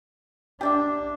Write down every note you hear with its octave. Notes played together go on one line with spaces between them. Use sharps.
D4 G4 D5 E5